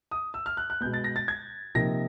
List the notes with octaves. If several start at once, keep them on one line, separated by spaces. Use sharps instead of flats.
D#6
E6
F6
F#6
F#6
B2 G#3 B3 G6
A6
A#6
A6
G#6
C3 F3 A#3 D#4 A#6